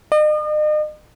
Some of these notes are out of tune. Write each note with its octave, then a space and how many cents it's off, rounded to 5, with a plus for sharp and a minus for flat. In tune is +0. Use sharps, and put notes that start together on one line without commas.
D#5 -40